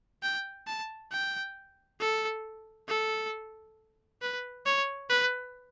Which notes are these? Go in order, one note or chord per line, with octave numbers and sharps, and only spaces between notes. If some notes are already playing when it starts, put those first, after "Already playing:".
G5
A5
G5
A4
A4
B4
C#5
B4